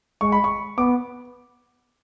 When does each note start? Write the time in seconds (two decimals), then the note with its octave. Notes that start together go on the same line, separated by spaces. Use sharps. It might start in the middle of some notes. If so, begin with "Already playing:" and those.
0.21 G#3 C#6
0.32 B5
0.44 C#6
0.77 B3 D6